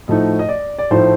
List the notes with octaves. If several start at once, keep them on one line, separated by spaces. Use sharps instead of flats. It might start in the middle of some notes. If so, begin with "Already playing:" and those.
A2 F3 A3 D#4 D#5
D#5
D5
D5
A2 F3 A3 D#4 C5